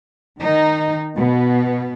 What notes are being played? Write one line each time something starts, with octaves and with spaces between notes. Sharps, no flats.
D#3 D#4
B2 B3